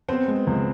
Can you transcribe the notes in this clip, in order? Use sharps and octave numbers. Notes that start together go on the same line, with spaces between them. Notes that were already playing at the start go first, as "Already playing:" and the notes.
B3 C4 C5
G#3
C#2